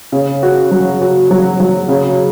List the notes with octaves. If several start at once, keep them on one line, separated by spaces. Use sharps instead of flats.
C#3
F#4
F#3
F#4
F#3
F#3
C#3